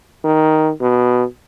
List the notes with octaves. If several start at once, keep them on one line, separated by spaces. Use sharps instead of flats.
D#3
B2